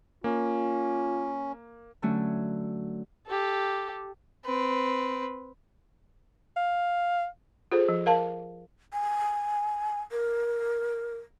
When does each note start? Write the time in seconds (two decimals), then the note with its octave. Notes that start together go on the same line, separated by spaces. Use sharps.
0.24 A#3 C#4 F4
2.02 D3 F#3 A3 C#4 F#4
3.27 G4 A4
4.44 C4 B4
6.57 F5
7.72 F4 G#4 A4 C5
7.89 F3
8.06 A#4 F5 A5
8.93 G#5
10.12 A#4